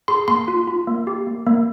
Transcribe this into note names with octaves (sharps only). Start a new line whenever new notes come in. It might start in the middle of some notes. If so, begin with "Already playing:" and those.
G#4 C6
A#3 C6
F4
F4
A#3
G4
A#3
A#3